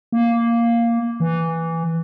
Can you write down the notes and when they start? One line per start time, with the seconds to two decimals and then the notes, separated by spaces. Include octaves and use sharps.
0.12 A#3
1.20 E3